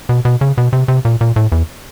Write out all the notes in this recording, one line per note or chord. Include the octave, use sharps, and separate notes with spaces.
B2
B2
C#3
B2
C3
C3
A#2
A#2
A2
E2